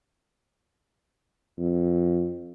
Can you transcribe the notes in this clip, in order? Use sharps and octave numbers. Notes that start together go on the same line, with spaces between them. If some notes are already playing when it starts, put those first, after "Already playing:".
F2